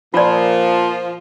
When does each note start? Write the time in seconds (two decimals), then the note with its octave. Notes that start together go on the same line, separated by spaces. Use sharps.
0.14 A#2 F3 F4 D5